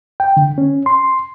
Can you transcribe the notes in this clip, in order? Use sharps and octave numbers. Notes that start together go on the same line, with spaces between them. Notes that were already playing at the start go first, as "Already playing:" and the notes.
G5
D3
C#4
C6